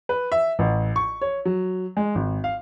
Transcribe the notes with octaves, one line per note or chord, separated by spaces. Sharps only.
B4
E5
A1
C#6
C#5
F#3
G#3
G#1
F5